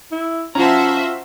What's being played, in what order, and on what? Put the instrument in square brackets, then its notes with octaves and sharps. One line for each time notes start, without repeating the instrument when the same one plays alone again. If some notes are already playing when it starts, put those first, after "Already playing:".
[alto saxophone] E4
[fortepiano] F3 C#4 [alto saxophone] F4 [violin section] F#4 C5 E5 [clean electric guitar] A#5